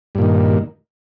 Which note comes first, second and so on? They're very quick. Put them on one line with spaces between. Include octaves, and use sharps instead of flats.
G2 A#2 D#3